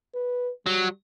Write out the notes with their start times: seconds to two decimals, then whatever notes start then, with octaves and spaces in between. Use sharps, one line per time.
0.15 B4
0.67 F#3 G3